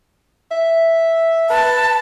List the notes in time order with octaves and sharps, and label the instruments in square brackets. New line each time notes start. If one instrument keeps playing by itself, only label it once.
[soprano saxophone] E5
[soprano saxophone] B4 [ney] A5